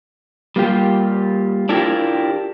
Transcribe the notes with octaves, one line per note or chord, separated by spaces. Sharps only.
G3 A#3 F4 G4
D4 E4 F4 G4 G#4 A#4